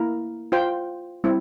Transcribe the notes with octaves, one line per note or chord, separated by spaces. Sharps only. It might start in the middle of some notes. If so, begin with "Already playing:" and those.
Already playing: A#3 E4 A#4
F4 C5 G5
G3 C4 E4